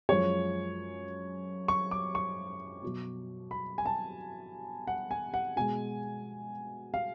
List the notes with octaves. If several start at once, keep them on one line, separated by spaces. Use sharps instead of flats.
F#2 F3 G#3 C#5
C#6
D6
C#6
B2 F#3
B5
G#5
A5
F#5
G#5
F#5
B2 G#3 G#5
F5